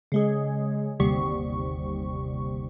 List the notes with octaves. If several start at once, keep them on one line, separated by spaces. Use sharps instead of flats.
C#3 G#3 G#4
G1 D#2 C3 G3 C#6